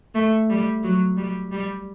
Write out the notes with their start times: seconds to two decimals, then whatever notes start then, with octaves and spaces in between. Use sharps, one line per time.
0.15 A3
0.50 G3
0.84 F#3
1.17 G3
1.52 G3